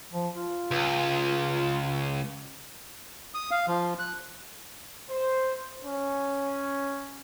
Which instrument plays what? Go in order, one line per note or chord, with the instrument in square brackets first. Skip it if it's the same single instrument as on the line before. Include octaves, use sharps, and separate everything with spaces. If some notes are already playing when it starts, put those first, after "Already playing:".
[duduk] F3
F4
[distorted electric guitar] C#2
[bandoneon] D#6
F5
F3
F#6
[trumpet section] C5
C#4